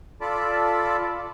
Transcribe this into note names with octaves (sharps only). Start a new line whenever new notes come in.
F4 A4 D5 A5 B5 D6